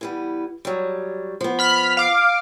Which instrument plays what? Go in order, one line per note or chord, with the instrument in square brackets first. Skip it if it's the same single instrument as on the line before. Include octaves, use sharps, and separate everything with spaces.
[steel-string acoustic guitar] E3 G3 B3
F#3 G3
F3 B3
[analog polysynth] B5 F6 B6
F5 D6